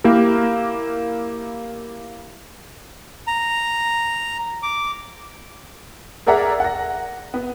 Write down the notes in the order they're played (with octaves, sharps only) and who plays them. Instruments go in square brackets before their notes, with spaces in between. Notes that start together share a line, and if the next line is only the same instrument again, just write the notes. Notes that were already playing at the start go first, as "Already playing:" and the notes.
[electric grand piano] A#3 E4 G4 A#4
[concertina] A#5
D6
[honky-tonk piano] G#4 A#4 D5 E5 F#5 A#5
F#5 A#6
B3